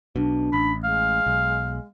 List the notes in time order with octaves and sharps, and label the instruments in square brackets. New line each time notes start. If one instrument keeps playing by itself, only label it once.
[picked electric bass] B1 B2 [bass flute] D4
[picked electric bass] A1 [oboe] B5
[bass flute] G#3 [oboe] F5
[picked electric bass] B1